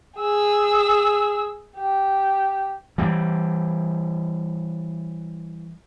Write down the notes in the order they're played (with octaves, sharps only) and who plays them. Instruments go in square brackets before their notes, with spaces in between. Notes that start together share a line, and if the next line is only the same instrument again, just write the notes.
[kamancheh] G#4 E6
G4
[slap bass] E3 G3